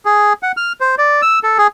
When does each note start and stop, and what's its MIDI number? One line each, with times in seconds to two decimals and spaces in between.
0.05 0.33 68
0.43 0.52 78
0.57 0.73 89
0.81 0.95 72
0.98 1.22 74
1.22 1.39 88
1.43 1.58 69
1.58 1.67 68